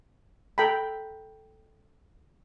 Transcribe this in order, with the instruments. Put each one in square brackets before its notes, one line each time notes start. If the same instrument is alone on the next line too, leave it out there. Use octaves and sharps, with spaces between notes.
[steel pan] A4 G5 A#5 B5